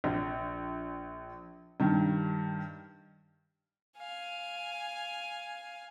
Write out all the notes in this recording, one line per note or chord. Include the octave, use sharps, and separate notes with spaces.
A#1
G2 D#3
F5 G#5